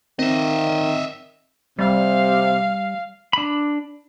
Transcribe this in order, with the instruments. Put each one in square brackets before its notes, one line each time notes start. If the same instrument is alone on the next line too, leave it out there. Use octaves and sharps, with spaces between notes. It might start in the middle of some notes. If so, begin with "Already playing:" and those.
[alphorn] D#3 [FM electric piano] C4 [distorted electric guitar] D#5 E5
[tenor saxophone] C3 [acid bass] G3 [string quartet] F5
[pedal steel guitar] D4 B5